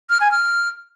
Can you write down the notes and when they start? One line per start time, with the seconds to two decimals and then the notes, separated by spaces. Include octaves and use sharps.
0.10 F6
0.21 G#5
0.31 F6